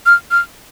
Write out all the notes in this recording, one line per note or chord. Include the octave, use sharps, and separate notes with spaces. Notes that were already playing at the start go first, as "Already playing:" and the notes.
F6
F6